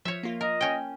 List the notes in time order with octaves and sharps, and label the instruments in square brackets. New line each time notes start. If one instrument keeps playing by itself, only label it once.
[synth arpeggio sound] F3 [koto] C#5 E5
[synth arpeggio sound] A#3 F4
[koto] A#4 [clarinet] D#5
[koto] C#4 G5